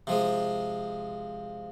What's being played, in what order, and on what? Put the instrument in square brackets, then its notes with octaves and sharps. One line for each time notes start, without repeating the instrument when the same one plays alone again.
[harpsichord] C3 F3 G#3